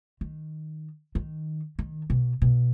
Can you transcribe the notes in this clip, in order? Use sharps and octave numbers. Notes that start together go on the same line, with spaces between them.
D#3
D#3
D#3
B2
B2